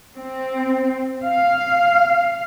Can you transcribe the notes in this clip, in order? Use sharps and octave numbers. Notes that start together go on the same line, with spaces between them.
C4
F5